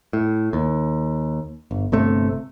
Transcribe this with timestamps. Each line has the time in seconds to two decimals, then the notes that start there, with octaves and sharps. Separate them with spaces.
0.13 A2
0.53 D#2
1.71 G1
1.92 G1 C3 A3